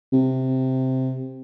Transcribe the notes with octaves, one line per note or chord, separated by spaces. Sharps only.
C3